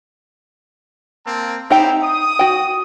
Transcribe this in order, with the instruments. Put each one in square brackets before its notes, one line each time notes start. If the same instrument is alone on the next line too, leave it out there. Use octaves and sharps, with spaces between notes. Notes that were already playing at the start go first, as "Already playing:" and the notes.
[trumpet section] A#3 C4 A5
[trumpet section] C4 E4 G4 [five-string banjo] D#4 G5 A#5
[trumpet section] D#6
[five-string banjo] F#4 G5